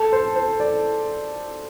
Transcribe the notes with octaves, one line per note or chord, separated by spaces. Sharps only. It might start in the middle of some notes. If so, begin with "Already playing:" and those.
Already playing: A4
C5
C5
D5